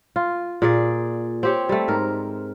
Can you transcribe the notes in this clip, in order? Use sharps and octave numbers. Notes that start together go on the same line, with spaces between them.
F4
A#2 G#4 D5
C4 G4 C#5
G3 A3
G#2 A#4